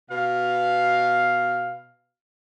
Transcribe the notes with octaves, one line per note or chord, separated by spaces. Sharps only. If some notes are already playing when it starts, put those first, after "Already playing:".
B2 F5